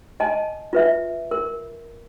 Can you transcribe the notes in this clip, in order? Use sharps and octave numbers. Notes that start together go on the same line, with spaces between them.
D#5 G#5 A5
F4 B4 E5
A#4